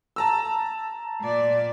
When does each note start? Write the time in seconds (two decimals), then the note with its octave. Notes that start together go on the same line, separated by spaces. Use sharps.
0.16 A5 A#5 E6
1.21 A#2 D5